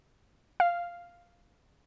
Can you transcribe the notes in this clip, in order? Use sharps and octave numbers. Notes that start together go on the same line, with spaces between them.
F5